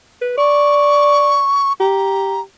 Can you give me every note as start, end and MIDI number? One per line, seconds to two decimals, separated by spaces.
0.21 0.34 71
0.38 1.42 74
0.38 1.73 85
1.80 2.42 67
1.80 2.41 82